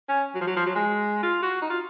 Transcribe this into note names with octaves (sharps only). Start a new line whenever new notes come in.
C#4
F#3
F3
F#3
F3
F#3
G#3
F4
F#4
D#4
F4